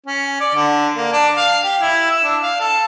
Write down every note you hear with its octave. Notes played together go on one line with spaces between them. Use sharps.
C#4
D5
D3
A#3
D4
F5
G4
E4
E6
D4
F5
A4